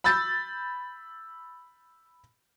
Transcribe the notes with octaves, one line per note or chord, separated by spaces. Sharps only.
B5 E6 G6 A6